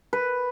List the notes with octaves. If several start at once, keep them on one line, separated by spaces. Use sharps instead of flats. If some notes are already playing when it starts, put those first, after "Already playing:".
B4